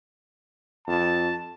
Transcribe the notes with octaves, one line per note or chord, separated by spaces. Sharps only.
F2 A5